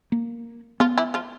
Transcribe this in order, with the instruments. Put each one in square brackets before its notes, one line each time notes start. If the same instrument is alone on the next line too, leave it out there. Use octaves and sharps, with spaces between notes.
[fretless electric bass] A#3
[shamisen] F3 F4 [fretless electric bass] B3
[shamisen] E3 E4
F3 F4